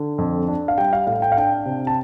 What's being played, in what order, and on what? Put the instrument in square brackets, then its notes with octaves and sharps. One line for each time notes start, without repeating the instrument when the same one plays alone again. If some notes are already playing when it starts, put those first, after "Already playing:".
Already playing: [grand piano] D3
F2
D4
F5
G3 G5
F5
A2 F5
G5
F5
D4 G5
C3
A5